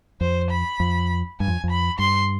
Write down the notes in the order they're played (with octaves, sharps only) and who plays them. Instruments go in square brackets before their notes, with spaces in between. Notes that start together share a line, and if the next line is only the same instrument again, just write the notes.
[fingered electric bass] F2 [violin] C5
[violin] B5
[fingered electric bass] F2
[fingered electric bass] G2 [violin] G#5
[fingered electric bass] F2
F2
[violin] B5
[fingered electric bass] G2 [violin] C6